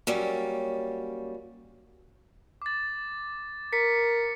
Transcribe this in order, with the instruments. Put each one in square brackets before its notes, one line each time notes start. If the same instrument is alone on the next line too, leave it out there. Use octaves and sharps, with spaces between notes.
[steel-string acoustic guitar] F#3 G3 A#3 C#4
[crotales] D6 A6
[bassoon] A#4 [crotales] B6 C#7